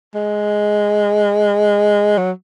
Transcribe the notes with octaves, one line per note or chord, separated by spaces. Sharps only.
G#3
F#3